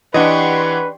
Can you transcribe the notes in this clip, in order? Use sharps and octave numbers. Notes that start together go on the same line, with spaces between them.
E3 D4 G4 B4 D#5 F#5 C6 C#6